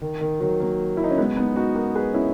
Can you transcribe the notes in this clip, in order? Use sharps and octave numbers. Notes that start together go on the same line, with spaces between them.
D#3
D#3
D#3 F#3
F#3 A#3
E4
D#4
C#4
G#3 B3
B3 D#4
D#4 F#4
F#4 A#4
G#4 B4
C#4 E4